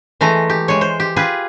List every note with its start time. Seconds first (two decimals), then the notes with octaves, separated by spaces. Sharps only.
0.21 E3 G#3 A3 A#5
0.50 G4
0.68 G#3 C#5
0.81 C5
1.00 G4
1.16 F4 G4 G#4 B4